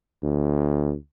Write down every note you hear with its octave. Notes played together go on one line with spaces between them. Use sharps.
D2